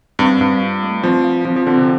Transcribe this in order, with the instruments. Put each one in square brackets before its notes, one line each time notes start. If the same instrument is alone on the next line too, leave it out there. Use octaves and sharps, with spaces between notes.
[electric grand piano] G2 [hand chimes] C4
[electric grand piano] G2 [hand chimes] F5
[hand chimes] F4
A3
[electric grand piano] F3 [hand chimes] C4
[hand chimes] F5
[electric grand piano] F3 [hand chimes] C4
[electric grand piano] F3
[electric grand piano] D3 [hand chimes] C4
[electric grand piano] C3